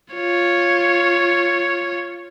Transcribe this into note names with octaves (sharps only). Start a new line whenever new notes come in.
F4 C#5